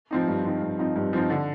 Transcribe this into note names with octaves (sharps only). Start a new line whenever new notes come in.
F3 C4 D#4
G2
F3 C4 D#4
G2
F3 C4 D#4
G2
F3 C4 D#4
D3